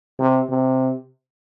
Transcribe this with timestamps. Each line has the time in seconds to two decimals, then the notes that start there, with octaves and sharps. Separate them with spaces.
0.19 C3
0.50 C3